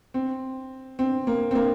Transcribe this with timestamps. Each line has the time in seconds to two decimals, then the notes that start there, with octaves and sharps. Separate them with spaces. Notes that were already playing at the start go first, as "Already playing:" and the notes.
0.14 C4
0.99 C4
1.27 A#3
1.51 C4
1.55 A#3